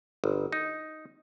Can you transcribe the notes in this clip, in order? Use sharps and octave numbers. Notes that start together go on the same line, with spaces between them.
G1
D#4